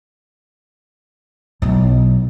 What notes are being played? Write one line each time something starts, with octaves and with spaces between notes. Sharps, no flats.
B1 E4